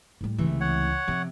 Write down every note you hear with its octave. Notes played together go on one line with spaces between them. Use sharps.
A2 G3
C#2 C3 E3 A3
C#5 F#5
C3 F3